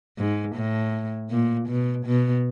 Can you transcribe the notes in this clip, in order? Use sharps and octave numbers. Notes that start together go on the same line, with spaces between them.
G#2
A2
A#2
B2
B2